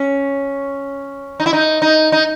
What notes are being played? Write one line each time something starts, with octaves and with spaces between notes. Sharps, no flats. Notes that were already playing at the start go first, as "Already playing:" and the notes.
Already playing: C#4
D#4
E4
D#4
D#4
D#4